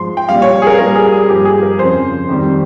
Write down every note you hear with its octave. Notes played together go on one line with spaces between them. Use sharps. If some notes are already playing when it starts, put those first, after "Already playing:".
Already playing: G#2 F3 C6
G5
A#2 G3 F5
C#5
G#4
A#4
A#2 G3 A#4
G#4
G#4
G2 F3 G4
G#4
A#4
F2 C#3 F3 C5
F2 D#3 G3